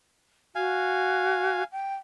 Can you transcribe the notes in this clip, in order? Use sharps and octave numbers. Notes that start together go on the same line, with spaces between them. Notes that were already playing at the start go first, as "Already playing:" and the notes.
F#4 F5 G#5
G5